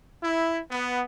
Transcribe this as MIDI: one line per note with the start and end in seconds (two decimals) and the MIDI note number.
0.23 0.60 64
0.71 1.03 59